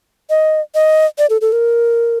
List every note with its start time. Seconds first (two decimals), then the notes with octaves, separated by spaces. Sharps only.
0.30 D#5
0.75 D#5
1.18 D5
1.30 A4
1.41 A4
1.52 A#4